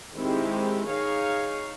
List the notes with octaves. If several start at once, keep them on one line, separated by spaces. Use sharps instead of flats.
D#3 G#3 C4 E4 G4
D#4 G#4 C#5 F5